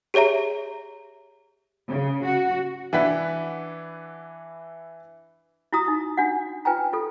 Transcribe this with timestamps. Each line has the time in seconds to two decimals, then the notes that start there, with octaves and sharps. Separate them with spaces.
0.14 G4 G#4 C#5 E5 A#5
1.88 C#3
2.26 F#4
2.93 E3 D4 E4 B4 F#5 B6
5.73 E4 F#4 A#5 D#6
5.88 D#4
6.17 D4 F#4 F#5
6.65 F4 B4 G5 G#5 A#5
6.93 F4 A4